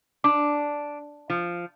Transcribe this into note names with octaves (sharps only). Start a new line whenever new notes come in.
D4 D6
F3